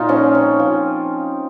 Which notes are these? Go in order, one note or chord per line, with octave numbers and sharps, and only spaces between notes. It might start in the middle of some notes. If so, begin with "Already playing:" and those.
Already playing: A#2 D#4 F4
F3 C#4
C4
F3